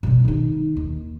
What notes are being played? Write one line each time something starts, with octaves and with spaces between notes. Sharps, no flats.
B2 G3
D#3 D#4
D#2